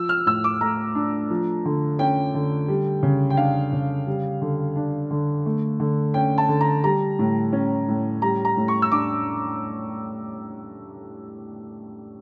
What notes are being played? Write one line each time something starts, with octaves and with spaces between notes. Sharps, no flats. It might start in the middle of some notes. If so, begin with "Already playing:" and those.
Already playing: F3 E6
F6
A2 E6
D6
A3 A#5
D4
F3
D3
C#4 G5
D3
G3
C#3
G5
D4 F5
C#3
G3
D3
D4
D3
A3
D3
C#4 G5
A5
D3
A#5
G3 A#5
A2
C#4
A2
G3 A#5
A#5
A2
C#6
E6
D4 D6